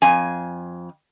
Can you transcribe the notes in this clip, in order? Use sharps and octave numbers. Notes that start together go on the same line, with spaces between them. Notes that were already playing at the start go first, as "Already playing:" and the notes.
F2 G#5